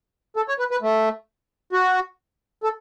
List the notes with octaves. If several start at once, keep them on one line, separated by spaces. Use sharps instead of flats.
A4
C#5
B4
B4
A3
F#4
A4